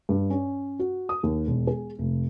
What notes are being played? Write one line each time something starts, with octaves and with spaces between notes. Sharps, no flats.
G2
C#4
F#4
D#6
D#2
E1
G#4
F1